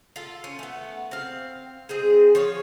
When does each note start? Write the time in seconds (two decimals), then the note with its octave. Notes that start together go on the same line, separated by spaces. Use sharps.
0.16 F4 A4
0.44 C#4
0.59 A3 B3
1.11 C4 F5
1.89 G#3 C4 G#4
2.35 F3 C#5 F5